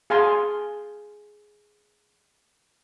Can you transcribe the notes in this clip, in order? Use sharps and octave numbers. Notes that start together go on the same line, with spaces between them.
G#4 F5 G#5 A5 C6